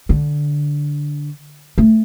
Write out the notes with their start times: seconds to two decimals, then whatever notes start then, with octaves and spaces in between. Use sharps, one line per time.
0.09 D3
1.78 A3